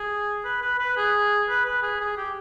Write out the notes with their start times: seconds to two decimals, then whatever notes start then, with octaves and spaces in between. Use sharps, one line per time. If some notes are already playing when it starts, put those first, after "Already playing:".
Already playing: G#4
0.44 B4
0.62 B4
0.79 B4
0.97 G#4
1.49 B4
1.65 B4
1.82 G#4
2.00 G#4
2.17 G4